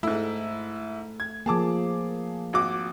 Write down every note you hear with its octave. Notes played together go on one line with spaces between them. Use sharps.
G#2 A3 E4
G#6
F3 A#3 G#4 A5 D6
G#1 F#4 D6